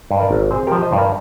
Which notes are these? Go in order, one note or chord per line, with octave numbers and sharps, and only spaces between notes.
G2
D#5
A#4 D5
G#1
C4 G#4 C5
F3 G4 A#4
C5 D#5
G2
A#4 D5